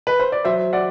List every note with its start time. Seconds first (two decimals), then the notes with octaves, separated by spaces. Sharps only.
0.07 B4
0.20 C5
0.32 D5
0.45 F#3 C5 E5
0.73 D5 F#5